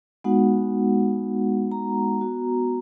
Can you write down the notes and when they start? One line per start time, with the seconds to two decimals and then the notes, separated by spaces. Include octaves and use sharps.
0.24 G#3 B3 D#4 F#4 F#5
1.72 A#5
2.21 B3 F#4